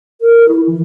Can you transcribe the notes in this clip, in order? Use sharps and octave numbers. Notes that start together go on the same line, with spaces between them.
A#4
E4
E3